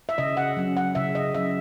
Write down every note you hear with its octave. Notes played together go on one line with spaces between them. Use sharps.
E5
C#3 D#5
F#5
F#3 C#4
F#5
C#3 E5
D#5
F#3 C#4 E5